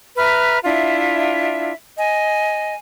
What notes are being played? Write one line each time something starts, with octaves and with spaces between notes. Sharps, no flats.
B4 E5 A#5 F6
D4 E4 F4 E5
D#5 G#5